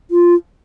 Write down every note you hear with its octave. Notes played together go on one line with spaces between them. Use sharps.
F4